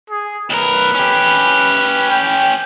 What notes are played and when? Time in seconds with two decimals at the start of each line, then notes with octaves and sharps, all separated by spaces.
0.10 G#4
0.50 B1 A#4 B4
0.95 C#4 G4
2.10 G5